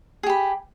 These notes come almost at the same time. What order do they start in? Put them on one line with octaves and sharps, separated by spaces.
G#4 G4 B5